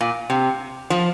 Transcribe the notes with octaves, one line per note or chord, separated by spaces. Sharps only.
A#2
C3
F3